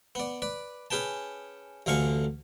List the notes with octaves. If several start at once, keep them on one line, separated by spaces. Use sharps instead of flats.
B3 D5
B4 D5
C#4 G#4 B4 G5 A5
A1 D2 D3 F5 G#5 C#6